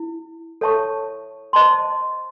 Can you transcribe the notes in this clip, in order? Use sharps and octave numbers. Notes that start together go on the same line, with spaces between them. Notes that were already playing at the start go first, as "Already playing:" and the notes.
Already playing: E4
A4 C#5 E5 A5 C#6
C5 D#5 A5 C6